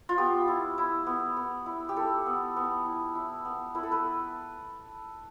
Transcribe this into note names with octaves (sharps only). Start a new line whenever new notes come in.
F4
B3 G4
E4
E4
B3
B3
E4
G4
E4 A4
B3
B3
E4
E4
B3
E4 B4
A4
B4